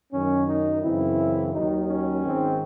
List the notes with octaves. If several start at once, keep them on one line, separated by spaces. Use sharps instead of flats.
F#2 D#3 F#3 C#4
D#4
F#2 C#3 E3 C4 E4
D#2 D#3 F#3 D#4
C#4
G#1 G#2 D#3 G#3 C4